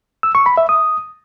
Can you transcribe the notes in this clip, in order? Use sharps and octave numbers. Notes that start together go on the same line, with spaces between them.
E6
C#6
B5
E5
D#6